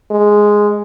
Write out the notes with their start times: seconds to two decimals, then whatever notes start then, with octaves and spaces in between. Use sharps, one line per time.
0.11 G#3